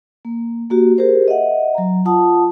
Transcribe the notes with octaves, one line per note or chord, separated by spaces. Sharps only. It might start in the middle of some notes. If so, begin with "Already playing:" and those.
A#3
A#3 F#4 G4
G4 G#4 A#4 C5
D#5 E5 F#5
F#3 A#5
F4 F#5 A5 D#6